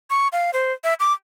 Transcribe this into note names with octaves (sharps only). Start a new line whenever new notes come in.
C#6
F5
C5
E5
D6